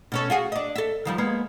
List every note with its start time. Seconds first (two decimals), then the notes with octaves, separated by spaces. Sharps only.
0.12 B2 C#4 A4
0.30 F4 F#4 G#4
0.52 D4 D#5
0.76 A4 E5
1.05 D#3 F3 G3
1.18 G#3 A#3 B3